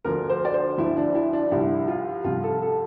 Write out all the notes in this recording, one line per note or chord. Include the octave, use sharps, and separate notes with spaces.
D2 D3 F3 A#4
C5
D5
C5
D2 D3 F3 E4
D4
E4
D4
C2 C3 F3 E4
F4
C2 C3 F3 F4
A4
A4